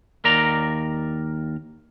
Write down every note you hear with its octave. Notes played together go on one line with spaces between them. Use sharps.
D#2 A#4 D5 A#5